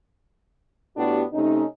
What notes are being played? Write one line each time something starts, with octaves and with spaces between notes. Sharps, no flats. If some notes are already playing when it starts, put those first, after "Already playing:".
A2 B3 D4 F#4 G4
C3 A3 C#4 D#4